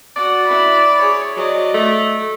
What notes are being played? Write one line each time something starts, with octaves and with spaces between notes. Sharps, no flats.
F#4 D5 F#5
E4 B5
G#4 C#5
F#3 D5 D#5
A3